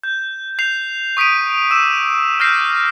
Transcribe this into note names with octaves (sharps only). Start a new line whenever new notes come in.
G6
G6 C7 F7
C#6 D#6 B6 D7 D#7
D6 E6 E7
E6 F6 G6 A#6 C7